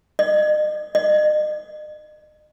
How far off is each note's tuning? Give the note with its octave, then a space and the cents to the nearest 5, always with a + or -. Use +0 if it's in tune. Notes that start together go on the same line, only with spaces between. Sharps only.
D#5 -40
D#5 -40